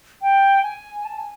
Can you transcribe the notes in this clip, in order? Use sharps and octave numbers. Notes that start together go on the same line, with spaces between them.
G5
G#5
A5
G#5